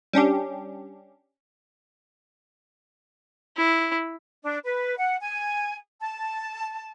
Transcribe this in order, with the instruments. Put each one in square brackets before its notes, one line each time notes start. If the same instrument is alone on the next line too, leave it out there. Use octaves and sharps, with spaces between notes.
[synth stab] G3 C#4 D4 G4
[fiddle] E4
[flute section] D4
B4
F#5
G#5
A5